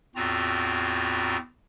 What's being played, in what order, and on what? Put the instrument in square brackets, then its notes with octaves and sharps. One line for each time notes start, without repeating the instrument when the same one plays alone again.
[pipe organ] E2 A2 C4 F4 F#4 A#5